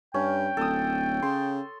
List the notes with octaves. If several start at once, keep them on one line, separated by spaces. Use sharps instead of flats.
G2 C#4 G5
D1 A4 D#6
C#3 C6